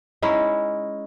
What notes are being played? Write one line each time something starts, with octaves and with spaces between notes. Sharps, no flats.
G#3 C#4 D#4 E4